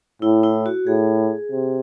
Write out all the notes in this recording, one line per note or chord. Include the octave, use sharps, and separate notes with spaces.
A2 E4
E4
F#4
A2 G#4
C3